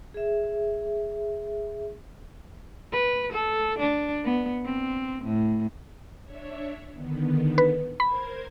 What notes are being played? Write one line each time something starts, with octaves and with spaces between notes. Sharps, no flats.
G#4 E5
B4
A4
D4
B3
C4
A2
D4 C#5 E5
D3 D#3 B3
B4
A#4 C5 B5 G#6